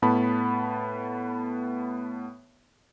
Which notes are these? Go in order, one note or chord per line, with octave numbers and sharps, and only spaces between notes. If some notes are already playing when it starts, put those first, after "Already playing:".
A2 B3 A5 B5